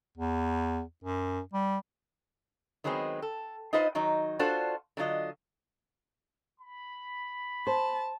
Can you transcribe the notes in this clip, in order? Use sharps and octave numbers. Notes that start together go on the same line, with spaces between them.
E2
F#2
G3
D#3 F#3 G#3 B3 C4
A4
D#4 F4 B4 C5 D#5
D#3 F#3 D#4
D4 F4 F#4 A4 C5
D3 F#3 F4 D#5
B5
C5 A5